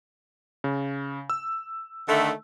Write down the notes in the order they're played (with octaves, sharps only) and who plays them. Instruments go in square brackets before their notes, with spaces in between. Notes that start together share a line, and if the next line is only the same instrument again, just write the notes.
[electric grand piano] C#3
E6
[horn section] D3 D#3 A3